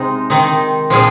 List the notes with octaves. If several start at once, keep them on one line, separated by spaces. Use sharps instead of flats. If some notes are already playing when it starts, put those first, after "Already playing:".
Already playing: C3 G#3 C4 D#4
D#3 C4 D#4
A#2 F3 C4 F4 G#4